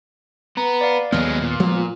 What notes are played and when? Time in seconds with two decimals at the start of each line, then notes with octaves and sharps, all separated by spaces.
0.57 B3 A#5
0.81 D5 F5
1.12 D#2 F#3 G#3 B3 F6
1.41 A#2
1.60 F3 G#3 B3